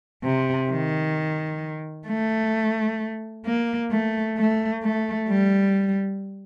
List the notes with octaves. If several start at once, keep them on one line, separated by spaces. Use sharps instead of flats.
C3
D#3
A3
A#3
A3
A3
A3
G3